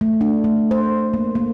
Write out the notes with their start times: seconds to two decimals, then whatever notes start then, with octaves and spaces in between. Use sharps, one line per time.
0.01 A3
0.21 D4
0.44 A3
0.71 C5
1.14 A#3
1.35 A#3